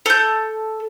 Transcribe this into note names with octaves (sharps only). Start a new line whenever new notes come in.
A4 G6